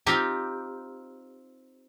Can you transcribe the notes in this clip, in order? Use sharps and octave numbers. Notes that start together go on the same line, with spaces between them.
C4 D#4 F4 G4